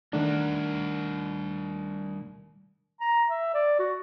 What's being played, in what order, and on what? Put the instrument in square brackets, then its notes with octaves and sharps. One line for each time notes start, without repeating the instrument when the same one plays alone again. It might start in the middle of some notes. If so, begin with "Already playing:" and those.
[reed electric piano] D#3 A3 D4 [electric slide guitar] G3 A#4 F#5
[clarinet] A#5
E5
D5
F#4